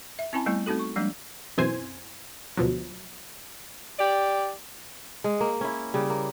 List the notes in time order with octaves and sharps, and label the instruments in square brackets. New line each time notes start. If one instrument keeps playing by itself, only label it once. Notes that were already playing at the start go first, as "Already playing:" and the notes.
[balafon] E5
C4 C#4 E4 G#5 A5 B5
G3 A3 B3 E4
A3 C4 D#4 F#4 A4
C#6
F3 G3 G#3 A#3 D4
[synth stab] B1 F#2 E3 C4 C5 G#5
D2 B2 F3 F#3
[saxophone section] G4 D5
[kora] G#3
A#3
C#4 E4
C#3 G3
A#3